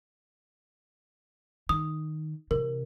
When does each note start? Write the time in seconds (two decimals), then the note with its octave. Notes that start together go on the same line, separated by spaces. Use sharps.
1.69 D#3 D#6
2.51 C3 E3 A#4